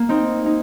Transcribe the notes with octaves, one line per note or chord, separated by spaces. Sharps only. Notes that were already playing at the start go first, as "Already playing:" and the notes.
Already playing: A#3
C4 D#4
D#4